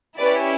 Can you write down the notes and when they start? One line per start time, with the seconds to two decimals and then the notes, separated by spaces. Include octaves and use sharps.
0.18 C#4 E4 G4 B4 D5